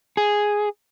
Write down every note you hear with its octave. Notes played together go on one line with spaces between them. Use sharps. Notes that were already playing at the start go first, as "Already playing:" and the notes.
G#4